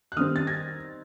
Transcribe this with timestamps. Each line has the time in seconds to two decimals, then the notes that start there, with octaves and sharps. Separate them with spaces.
0.12 F#6
0.17 D#3 G3 C4 D#6 F6
0.36 A6
0.47 G#6 A#6